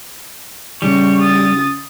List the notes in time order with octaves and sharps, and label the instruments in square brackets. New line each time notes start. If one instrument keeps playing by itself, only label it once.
[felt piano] C#3 [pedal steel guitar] G3 [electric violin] C#6
[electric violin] D#6 A6